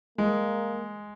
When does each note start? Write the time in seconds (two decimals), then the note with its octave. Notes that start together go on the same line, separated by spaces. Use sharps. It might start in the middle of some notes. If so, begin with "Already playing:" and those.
0.18 G#3 A#3